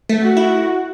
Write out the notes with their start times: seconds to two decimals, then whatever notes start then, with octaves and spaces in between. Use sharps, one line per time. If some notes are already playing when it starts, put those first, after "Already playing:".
0.09 A3
0.23 F#4
0.37 E4